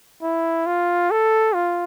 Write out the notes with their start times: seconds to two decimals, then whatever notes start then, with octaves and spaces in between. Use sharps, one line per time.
0.23 E4
0.66 F4
1.11 A4
1.54 F4